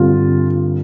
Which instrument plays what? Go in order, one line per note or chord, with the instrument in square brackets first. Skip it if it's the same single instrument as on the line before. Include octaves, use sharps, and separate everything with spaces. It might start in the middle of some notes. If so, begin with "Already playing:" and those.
Already playing: [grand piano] G2 D3 G3 C4 F4